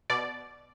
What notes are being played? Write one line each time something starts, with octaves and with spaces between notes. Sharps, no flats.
B2 D5